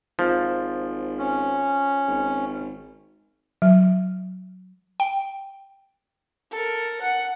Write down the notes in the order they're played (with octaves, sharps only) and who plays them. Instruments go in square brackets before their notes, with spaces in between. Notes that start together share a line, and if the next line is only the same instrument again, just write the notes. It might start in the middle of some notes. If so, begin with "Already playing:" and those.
[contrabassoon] G#1 [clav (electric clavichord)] F3
[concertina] C#4
[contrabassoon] G#1
[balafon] F#3
[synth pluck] G5
[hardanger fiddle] A4 A#4
F#5